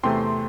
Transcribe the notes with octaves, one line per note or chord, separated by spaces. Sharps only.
E2 C3 A3 C4 G5 C6